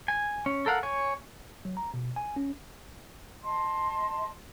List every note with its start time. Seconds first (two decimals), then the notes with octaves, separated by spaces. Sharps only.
0.08 G#5
0.46 C#4
0.66 A4 A#4 F5 F#5
0.83 C#5 G#5
1.65 F#3
1.77 A#5
1.94 B2
2.16 G#5
2.36 C#4
3.43 D#5 A5 C6